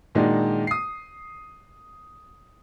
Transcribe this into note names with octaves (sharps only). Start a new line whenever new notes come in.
A#2 D#3 G#3 D4 D#4 F#4
D#6 C7